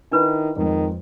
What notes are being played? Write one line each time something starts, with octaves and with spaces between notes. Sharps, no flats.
D#3 D4 E4 B4 B5
F2 D#3 G#3